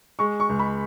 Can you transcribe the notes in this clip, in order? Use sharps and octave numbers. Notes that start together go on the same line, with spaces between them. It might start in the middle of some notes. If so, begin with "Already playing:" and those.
G#3 C#6
C#6
C#2
B5